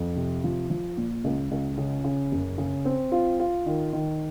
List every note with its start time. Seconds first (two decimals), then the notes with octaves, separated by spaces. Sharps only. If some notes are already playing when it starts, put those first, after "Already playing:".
Already playing: F2
0.16 C3
0.44 F3
0.70 F3
0.97 A#2
1.24 C#2
1.51 C#2
1.78 C#3
2.04 C#3
2.32 F#1
2.58 C#3
2.85 C4
3.12 F4
3.40 F4
3.66 D#3
3.93 D#3